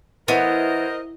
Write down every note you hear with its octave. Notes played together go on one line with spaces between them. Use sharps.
E3 B3 A#4 C5 D#5